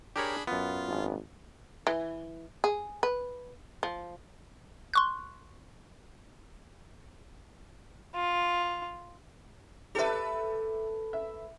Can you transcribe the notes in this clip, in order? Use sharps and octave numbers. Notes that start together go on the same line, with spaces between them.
D4 G4 G#4 A#4 C#5 B5
F#2 B3 F4
G#1
E3
G#4
B4
F3
C6 C#6 F#6
F4
G4 A4 B4 E5
E5